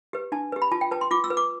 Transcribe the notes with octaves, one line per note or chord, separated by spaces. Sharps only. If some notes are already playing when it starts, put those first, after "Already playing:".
G4 B4
D4 A5
G4 B4
B5
F4 A5
G5
B4 A5
C6
F4 D6
E6
B4
D6